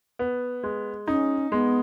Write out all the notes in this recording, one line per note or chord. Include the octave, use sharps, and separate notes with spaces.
B3
G#3
C#4 D#4
G#3 B3